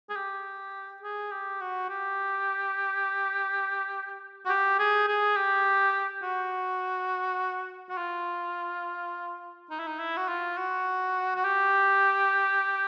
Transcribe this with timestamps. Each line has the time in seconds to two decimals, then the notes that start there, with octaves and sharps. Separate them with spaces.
0.09 G#4
0.16 G4
1.02 G#4
1.31 G4
1.61 F#4
1.89 G4
4.46 F#4
4.49 G4
4.79 G#4
5.08 G#4
5.36 G4
6.23 F#4
7.89 F#4
7.97 F4
9.70 D#4
9.79 E4
9.87 D#4
9.99 E4
10.17 F#4
10.28 F4
10.57 F#4
11.35 F#4
11.44 G4